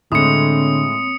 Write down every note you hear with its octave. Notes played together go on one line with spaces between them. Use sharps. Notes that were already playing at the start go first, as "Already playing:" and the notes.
A2 D3 G#3 A#3 C4 C#5 D#6 C#7